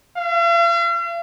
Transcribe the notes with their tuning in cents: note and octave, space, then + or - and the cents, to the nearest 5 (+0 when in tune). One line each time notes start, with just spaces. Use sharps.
F5 -45